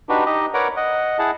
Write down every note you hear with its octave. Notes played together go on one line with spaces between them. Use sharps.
D4 D#4 F#4 G4 B4
D#4 G4 D#5
A#4 B4 C#5 D5 F#5 A#5
D#5 F#5
E4 G#4 F#5 A5